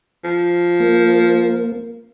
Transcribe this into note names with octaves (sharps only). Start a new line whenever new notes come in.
F3
A#3